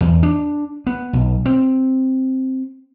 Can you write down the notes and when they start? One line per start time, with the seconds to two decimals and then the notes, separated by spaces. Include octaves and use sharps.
0.01 E2
0.23 D4
0.87 B3
1.13 B1
1.46 C4